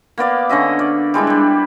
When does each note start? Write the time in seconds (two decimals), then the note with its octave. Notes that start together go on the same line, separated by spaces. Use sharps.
0.18 A#3 B3 D5 F5
0.49 D3 C#4 D#5 E5
0.79 D5
1.14 G3 G#3 D4 E4
1.27 G3 D4